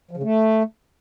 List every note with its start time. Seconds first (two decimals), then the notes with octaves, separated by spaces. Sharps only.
0.11 F3
0.17 C#3
0.23 A3